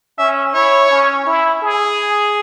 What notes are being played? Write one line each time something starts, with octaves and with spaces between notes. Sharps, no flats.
C#4 E5
E4 C#5
C#4
E4
G#4